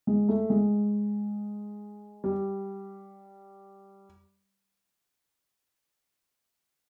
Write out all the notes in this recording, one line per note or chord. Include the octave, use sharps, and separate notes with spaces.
G#3
A3
G#3
G3